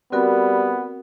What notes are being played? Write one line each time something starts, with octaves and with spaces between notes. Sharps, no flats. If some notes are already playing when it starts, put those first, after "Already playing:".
G3 B3 C4 F#4 A#4